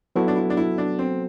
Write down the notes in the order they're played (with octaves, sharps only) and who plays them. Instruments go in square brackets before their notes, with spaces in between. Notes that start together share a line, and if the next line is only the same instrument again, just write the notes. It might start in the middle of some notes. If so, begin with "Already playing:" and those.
[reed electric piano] F#3 B3 F#4 A4 [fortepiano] E4
[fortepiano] D4
E4
D4
E4
D4
C4